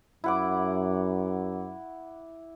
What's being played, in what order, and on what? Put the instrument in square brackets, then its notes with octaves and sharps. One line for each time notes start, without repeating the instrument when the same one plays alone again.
[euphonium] F#2 [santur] E4 F#5 D6